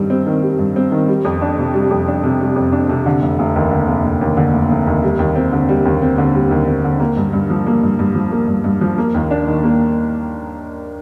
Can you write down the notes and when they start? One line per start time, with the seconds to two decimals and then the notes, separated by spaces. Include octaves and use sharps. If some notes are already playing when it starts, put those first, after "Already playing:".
Already playing: G2 D#3 G3 C4
0.10 C4
0.26 D#3
0.42 G3
0.59 G2
0.76 C4
0.92 D#3
1.08 G3
1.25 F2
1.42 D4
1.59 C3
1.74 G3
1.91 F2
2.08 D4
2.24 C3
2.40 G3
2.56 F2
2.72 D4
2.89 C3
3.06 D3
3.22 F1
3.39 F1
3.56 D#2
3.71 D3
3.88 F1
4.04 F1
4.21 D#2
4.37 D3
4.54 F1
4.70 F1
4.87 D#2
5.03 G3
5.19 D#2
5.36 C4
5.52 D3
5.69 G3
5.85 D#2
6.02 C4
6.18 D3
6.35 G3
6.51 D#2
6.68 C4
6.84 D3
7.00 A#3
7.17 G2
7.33 G2
7.50 F3
7.67 A#3
7.83 G2
7.99 G2
8.15 F3
8.31 A#3
8.48 G2
8.64 G2
8.81 F3
8.98 A#3
9.14 D#2
9.31 D4
9.47 D#3
9.64 A#3